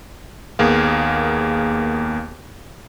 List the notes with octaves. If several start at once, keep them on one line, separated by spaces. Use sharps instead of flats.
D#2 A#3 B3 G#4 F5